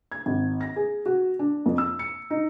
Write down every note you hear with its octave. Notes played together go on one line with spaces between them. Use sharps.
G#6
G#1
A#6
G#4
F#4
D4
F2
E6
C#7
D#4